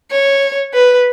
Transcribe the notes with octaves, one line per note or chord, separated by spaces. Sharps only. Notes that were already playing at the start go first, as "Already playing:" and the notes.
C#5
B4